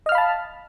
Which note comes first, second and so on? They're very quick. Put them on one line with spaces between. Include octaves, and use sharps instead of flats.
D#5 F6 F5 B5 A5